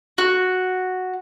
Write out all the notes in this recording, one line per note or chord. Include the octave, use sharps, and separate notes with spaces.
F#4